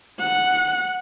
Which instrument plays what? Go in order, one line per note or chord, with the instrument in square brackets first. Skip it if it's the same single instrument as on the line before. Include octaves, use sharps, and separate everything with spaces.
[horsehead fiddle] F#5